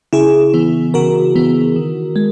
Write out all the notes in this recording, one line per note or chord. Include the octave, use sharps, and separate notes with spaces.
C#3 E4 G#4
E3 B3
C#3 F#4 A#4
E3 B3
D#3
G#3